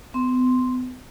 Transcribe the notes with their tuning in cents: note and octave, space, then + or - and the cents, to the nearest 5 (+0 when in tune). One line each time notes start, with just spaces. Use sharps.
B3 +35 C6 +0